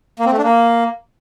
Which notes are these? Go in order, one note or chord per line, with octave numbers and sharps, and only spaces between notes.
A#3
C4
A3
D4
A#3